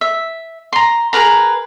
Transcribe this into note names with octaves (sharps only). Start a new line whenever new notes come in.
E5
A#5 C6
G#4 A#4 B4 A#5